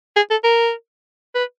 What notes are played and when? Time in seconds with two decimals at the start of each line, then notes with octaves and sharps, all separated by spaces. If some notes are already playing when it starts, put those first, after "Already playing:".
0.16 G#4
0.31 A4
0.44 A#4
1.35 B4